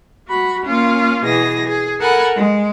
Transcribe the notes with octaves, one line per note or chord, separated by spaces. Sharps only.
F#4 B5
A#3 C#4 F4
B2 E3 G#4 D#6 A#6
G#4
A4 A#4 F#5 G#5 B5
G#3